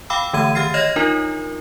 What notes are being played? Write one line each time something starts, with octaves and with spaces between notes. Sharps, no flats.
F5 G5 B5 D6 E6
D3 E3 A3 E6 G#6 D#7
D#3 G4 F6 A6 C7
C#5 D#5 F6 G#6 A#6 E7
D4 D#4 F4 A#4